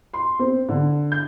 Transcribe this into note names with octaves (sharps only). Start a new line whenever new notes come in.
C6
C4
D3
G6